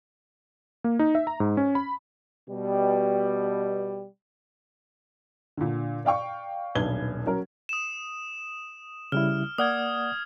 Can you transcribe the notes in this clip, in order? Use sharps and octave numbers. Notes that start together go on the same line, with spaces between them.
A#3
D#4
E5
A#5
G#2
C#4
B5
B2 G3
A#2 D3
D5 F5 G5 C#6
D#1 B1 D4 B4 G#6 G7
F#3 C#4 A#4
D#6 E7
C#3 G3 E4 F6
A#3 D5 F#5 D#6 F6 G#6